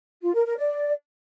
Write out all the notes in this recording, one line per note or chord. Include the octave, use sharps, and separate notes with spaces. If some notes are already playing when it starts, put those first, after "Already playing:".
F4
A#4
A#4
D5